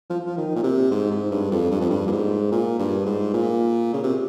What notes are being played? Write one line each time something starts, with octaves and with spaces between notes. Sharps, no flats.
F3
F3
D#3
A#2
C3
G#2
G#2
G2
F2
G2
F2
G2
A#2
G#2
A#2
G2
G#2
A#2
C#3
C3